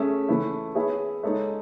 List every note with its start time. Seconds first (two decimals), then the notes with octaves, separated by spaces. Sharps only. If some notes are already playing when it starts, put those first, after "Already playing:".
Already playing: A3 C#4 G#4 C#5 E5
0.28 E3 A3 E4
0.75 B3 E4 G#4 C#5 E5
1.23 G#3 D#4 A4 C#5 E5